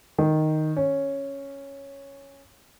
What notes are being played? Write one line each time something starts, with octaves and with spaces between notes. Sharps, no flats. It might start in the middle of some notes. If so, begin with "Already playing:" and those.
D#3
C#4